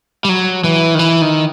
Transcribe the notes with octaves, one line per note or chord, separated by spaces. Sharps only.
G3
F#3
E3
D#3
E3
D#3